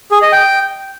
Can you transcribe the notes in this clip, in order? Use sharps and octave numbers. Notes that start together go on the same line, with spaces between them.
G#4
D#5
G5